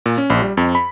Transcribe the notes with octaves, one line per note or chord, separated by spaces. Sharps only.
A#2
C#4
A#1
G3
F2
B5